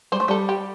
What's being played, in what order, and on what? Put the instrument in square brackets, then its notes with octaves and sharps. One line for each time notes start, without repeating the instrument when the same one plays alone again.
[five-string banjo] G3 [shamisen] C5
[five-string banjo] A3
[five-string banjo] G3 [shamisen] A4
[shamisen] G4